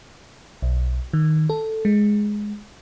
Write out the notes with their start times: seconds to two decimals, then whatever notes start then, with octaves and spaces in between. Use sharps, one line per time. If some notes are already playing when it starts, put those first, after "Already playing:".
0.62 B1
1.13 D#3
1.50 A4
1.85 G#3